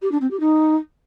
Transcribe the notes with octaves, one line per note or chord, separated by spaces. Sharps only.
G4
D4
C4
G4
D#4